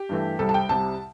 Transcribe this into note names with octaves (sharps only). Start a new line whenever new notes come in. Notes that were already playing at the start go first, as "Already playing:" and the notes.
Already playing: G4
G2 E3 A3
C2 C3 G3 A4
A5
G5
C2 C3 G3 A5